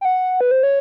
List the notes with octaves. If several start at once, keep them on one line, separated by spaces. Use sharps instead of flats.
G5
F#5
B4
C5
C#5